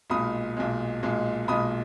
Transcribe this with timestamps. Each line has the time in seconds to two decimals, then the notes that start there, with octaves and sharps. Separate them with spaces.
0.10 B1 A#2 G#3 B5 D#6
0.57 B1 A#2 G#3
1.03 B1 A#2 G#3
1.48 B1 A#2 G#3 B5 D#6